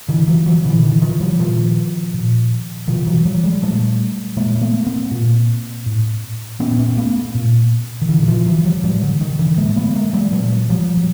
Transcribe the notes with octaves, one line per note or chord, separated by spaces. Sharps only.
D3 E3
E3 F#3
E3 F#3
A#2 D3 E3
D3 E3
D#3 F3
F3 G3
A#2 D#3 F3
A#2
B2 D#3 F3
E3 F#3
F3 G3
F#3 G#3
A#2 G3 A3
A#2 G#3 A#3
A3 B3
A#3 C4
A#2
A2
A#2 B3 C#4
B3 C#4
A3 B3
A#2
D#3
A#2 D3 E3
F#3
D#3 F3
E3 F#3
F3 G3
A2 F#3 G#3
D3
D#3
D3 E3
A2 G#3 A#3
A3 B3
G#3 A#3
F#3 G#3
A#2 F#3 G#3
F3 G3
F#3